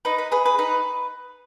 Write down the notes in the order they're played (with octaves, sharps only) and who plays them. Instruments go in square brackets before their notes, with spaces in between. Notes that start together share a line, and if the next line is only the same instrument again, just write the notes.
[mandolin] D#4 B4
B4
G#4 B4
B4
D#4 B4